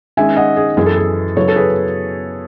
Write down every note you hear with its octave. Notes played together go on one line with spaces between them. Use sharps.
D#3 G#3 C#4 E5 G#5
D#5 F#5
G#4
F#2 E3 B3 G#4
A4
G#4
C#3 F#3 B3 E4 A4 C#5
A4
G#4 B4